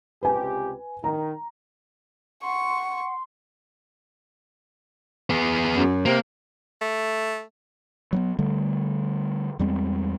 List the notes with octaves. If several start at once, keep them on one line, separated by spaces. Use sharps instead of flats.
C#2 C3 G4 B4 G#5
D#3 A#5
F#5 C6 C#6
B3 G#4
F#2
C3 A#3
A3
F#3 A#3 B3
D3 G3 A3
E2 G3 G#3 C4